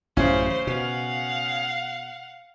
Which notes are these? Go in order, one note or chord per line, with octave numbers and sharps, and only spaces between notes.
A1 F#2 C#3 C#4 C5
B2 F5 F#5